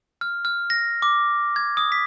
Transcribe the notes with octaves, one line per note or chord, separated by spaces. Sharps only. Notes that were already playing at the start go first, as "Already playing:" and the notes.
F6
F6
A#6
D6
G#6
D#6
B6